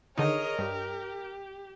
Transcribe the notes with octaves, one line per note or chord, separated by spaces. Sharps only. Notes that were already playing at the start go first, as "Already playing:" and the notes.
D3 D#3 D#4 G#4 A#4 C#5 D#5
G2 G4